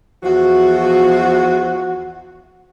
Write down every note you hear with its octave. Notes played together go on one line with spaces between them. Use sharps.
E2 F3 F#4